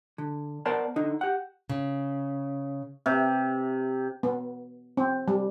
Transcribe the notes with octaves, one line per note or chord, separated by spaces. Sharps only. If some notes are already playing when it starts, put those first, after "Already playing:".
D3
B3 A#4 C5 D5 F#5 A5
D3 D#4
G4 F#5
C#3
C3
B3
C4
G3